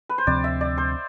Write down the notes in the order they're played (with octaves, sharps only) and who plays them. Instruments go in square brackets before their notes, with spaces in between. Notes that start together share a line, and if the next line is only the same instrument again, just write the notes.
[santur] B4
C5
[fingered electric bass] D2 C3 F3 C4 [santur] D5
[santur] E5
D5
C5